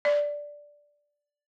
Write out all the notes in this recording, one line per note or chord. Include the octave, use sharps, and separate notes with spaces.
D5